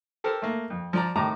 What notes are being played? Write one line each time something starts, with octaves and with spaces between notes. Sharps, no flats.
G4 A4 A#4 C5
A3 A#3
F2
F3 D5 A#5
A2 C3 D#3 A5 A#5 D6